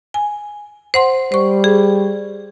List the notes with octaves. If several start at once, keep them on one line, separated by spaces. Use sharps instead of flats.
G#5
C5 F#5 C6
G3 C5 C#6
G#4